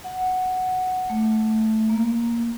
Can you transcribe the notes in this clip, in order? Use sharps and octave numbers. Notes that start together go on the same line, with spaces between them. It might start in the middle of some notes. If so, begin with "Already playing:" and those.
F#5
A3
A#3